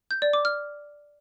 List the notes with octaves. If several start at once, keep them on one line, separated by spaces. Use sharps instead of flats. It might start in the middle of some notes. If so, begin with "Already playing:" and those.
G6
D5
D6
F6